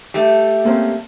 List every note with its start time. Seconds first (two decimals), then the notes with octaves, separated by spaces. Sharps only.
0.14 G3 A3
0.65 A#3 C4 C#4